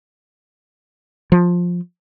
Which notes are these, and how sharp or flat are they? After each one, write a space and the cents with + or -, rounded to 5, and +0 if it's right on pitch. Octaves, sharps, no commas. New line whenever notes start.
F3 +10